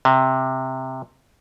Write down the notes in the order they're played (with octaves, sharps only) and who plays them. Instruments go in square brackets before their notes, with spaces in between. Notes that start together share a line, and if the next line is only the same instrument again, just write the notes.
[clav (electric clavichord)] C3